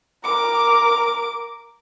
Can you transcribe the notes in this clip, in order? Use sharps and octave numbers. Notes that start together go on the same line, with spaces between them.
A#4 D6